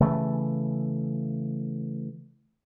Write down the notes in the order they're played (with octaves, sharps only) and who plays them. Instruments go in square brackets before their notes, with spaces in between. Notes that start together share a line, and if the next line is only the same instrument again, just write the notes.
[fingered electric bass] C#3 E3 A3